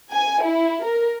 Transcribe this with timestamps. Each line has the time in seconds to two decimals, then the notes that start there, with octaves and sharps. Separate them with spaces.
0.11 G#5
0.42 E4
0.82 A#4